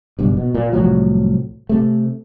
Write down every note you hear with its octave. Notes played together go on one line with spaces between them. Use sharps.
F#1 B1 G2
B2
A#2
C2 A2 F3 F#3
C3 A3